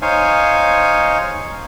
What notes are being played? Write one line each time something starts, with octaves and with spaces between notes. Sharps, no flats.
D#4 C5 C#5 F5 G#5